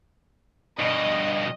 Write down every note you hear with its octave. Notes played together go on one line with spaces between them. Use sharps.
G2 B2 D#5